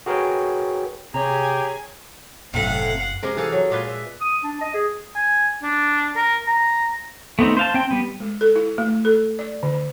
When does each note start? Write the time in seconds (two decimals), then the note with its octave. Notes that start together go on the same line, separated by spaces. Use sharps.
0.06 F#4 G#4 A#4 B4 C#5 G5
1.14 C3 G4 G#4 C#5 G#5 A#5
2.54 F#1 F#2 A2 C3 F5 F#5
3.23 C3 G#3 A#4
3.37 E3 G#4 A4 F5
3.52 F#3
3.70 A#2 G#3 F4 B4
3.88 E5
4.21 D#6
4.43 D4
4.61 D#5
4.74 G#4
5.15 G#5
5.63 D4
6.16 A#4
6.47 A#5
7.39 A3 B3 C4 D#4
7.57 C5 F5 A5
7.74 C4 G5
7.91 G3 B3
8.20 G#3
8.41 A4
8.56 E4
8.78 A3
9.05 A4
9.39 D5
9.63 D3